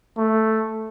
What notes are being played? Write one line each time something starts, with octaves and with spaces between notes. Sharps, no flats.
A3